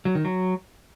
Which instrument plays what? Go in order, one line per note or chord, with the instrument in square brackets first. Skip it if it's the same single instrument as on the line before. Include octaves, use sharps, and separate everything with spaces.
[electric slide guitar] F#3
D#3
F#3